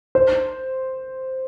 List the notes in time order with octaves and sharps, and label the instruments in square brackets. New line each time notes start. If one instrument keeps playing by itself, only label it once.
[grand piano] C5